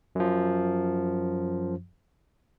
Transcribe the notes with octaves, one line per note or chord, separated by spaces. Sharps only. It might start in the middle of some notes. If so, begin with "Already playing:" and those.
F#2 F3